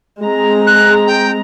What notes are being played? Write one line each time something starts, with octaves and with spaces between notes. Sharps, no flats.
G#3 C4 A#5
F#6
G5